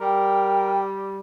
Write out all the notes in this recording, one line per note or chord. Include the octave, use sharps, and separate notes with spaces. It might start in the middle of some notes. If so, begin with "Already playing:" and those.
G3 A#4 G5